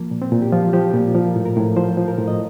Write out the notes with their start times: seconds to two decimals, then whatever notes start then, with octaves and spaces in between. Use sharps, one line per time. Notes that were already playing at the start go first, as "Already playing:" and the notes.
Already playing: F3 A#3
0.11 A#2
0.22 C4
0.31 A#2
0.42 G4
0.52 F3 F4
0.73 F3 G4
0.94 A#2
1.15 F3 A#4
1.36 A2
1.46 A#4
1.56 A2
1.77 F3 C5
1.97 F3
2.08 A#4
2.18 A2
2.28 D#5